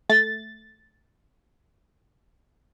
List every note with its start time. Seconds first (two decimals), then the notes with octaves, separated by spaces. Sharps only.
0.09 A3 A6